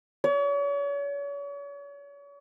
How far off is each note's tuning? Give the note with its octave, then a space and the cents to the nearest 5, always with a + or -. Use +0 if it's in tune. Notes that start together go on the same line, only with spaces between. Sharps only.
C#5 +40